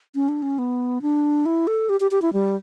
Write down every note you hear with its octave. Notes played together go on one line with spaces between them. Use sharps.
C#4
D4
C#4
B3
D4
E4
A4
G4
G4
G4
E4
G3